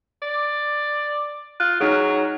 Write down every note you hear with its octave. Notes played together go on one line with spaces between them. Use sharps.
D5
F4 F#6
F#3 D#4 G#4